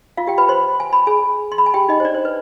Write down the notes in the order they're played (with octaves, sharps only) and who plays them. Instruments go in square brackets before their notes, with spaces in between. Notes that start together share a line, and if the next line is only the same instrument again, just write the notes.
[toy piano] F4 F5
G4 G5
B4 B5
C5 C6
G#5
B5
G#4 G#5
C6
B5
G#5
G4 G5
D#4 D#5
C5
D4 D5
C5
B4